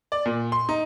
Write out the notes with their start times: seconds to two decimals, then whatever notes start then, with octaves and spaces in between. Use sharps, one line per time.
0.12 D5
0.26 A#2
0.52 C6
0.69 D#4